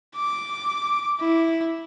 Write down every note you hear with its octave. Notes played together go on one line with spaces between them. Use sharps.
D6
E4